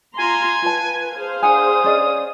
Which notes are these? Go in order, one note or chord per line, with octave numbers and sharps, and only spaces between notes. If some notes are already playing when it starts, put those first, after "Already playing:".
F4 G#5 A#5 C6
F4 B4 A5
G#4 C5 F5
D4 F#5 G#5 D#6
C#4 D5 D#5